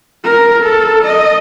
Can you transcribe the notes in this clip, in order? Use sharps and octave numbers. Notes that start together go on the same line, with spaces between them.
A#4
A4
D#5